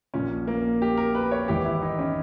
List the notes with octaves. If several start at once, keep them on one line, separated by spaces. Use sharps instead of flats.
A#1 A#2 C#4
A#3
G4
A#4
B4
C#5
G#1 G#2 E3 G4
E4
D#4
C#4